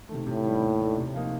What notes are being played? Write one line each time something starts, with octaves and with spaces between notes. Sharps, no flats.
C3 D#3 A3
A2 C3
D#3 G3
D#2
D#3 A3 D4
C3
F3 A#3 D#4